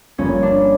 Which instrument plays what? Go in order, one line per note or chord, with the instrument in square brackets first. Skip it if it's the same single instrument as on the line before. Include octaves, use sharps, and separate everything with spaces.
[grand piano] G1 G2 D3 F3 A#3 [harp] C#4
[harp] D4